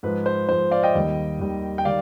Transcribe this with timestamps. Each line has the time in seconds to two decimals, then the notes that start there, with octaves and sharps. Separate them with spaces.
0.03 G#2 F3 B4
0.26 C5
0.49 G#2 F3 C5
0.71 D5 F5
0.83 D#5 G5
0.95 D#2 D#3 G3
1.40 D#2 D#3 G3
1.78 G5
1.85 D#3 G3 D5 F5